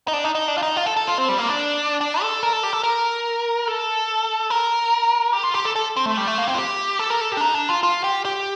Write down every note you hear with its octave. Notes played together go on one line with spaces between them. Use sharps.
D#4
D4
D#4
D#4
D4
F4
D#4
F4
A4
A4
F4
C4
G3
A#3
D4
D4
A4
A#4
A4
G4
A4
A#4
A4
A#4
G4
F4
G4
A4
A4
C4
A3
G3
A3
A#3
C4
F4
G4
A4
A#4
A4
G4
D4
D#4
D4
F4
F4
G4
G4